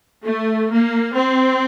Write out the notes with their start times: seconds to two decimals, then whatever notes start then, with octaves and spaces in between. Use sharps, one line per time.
0.24 A3
0.71 A#3
1.17 C4